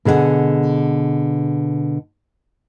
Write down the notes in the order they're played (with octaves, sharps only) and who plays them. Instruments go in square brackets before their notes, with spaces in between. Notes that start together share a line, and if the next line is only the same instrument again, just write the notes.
[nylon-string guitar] B2 D3 G#4 E5 F#5